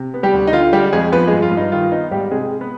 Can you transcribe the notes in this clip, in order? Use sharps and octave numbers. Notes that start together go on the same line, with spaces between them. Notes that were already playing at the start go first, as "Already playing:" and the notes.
Already playing: C3
B3
G3 G4
D2
D#4
D3 F4
G3 G#3 G4
F2 G#3 G#4
F3 B3 B4
G#3 G#4
G2
F4
G2
D#4
D#3 F4
B3 D#4
G#2 G3 G4
C3 G#3 G#4
G#3
B3 B4